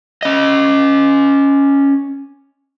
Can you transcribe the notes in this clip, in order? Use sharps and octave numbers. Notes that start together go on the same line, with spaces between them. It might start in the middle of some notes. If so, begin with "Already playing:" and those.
C#4 D#5